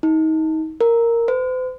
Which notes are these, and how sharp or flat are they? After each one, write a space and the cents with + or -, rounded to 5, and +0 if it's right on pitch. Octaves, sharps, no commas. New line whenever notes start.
D#4 +30
A#4 -5
C5 -45